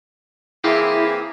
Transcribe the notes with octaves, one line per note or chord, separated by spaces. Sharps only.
E3 A#3 C4 E4 G4 G#4